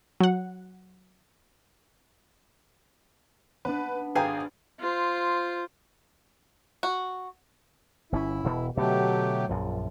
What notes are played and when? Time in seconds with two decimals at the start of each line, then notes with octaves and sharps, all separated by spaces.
0.20 F#3 F#5
3.65 B3 D4 B4
4.15 G#1 G#4 B4 F5 G5 G#5 A#5
4.80 F4 C5
6.83 F#4
8.12 G1 C4 C#4 E4
8.44 E1 B2
8.77 B2 D3 F#3 A3 G4
9.49 A#1 F#2 F3